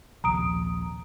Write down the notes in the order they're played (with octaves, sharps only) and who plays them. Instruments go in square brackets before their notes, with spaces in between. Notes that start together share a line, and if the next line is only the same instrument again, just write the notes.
[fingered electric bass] A#1 D#2 C3 [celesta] A#5 D#6 D7